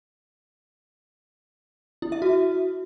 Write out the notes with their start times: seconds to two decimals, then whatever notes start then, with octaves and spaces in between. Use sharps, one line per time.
2.02 E4
2.12 E5
2.22 F#4